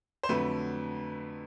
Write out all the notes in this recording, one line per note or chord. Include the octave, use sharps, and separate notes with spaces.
C5
F2 D3 F#3 A3 B4